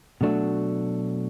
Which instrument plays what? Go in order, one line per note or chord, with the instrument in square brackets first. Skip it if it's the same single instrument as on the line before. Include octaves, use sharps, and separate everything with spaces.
[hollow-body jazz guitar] B2 F#3 A3 D4 F#4